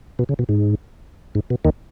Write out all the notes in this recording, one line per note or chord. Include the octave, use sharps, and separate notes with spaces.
B2
C#3
B2
G#2
G#2
B2
D#2 D#3